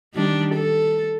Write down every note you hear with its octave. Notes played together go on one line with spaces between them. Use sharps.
D#3 G3 D4
A4